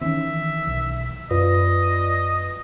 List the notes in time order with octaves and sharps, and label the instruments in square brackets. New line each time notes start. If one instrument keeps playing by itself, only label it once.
[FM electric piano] D#3 E3 [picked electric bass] C4 C#4 [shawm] E5
[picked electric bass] B1
[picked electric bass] F#2 [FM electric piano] F4 B4 D5 [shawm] D#5